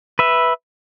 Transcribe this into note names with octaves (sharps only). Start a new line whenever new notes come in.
B4 E5